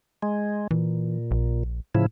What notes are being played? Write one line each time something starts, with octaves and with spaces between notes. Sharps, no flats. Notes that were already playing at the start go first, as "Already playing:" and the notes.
G#3
A#2 E3
A#1
A2 C#3 F3 E4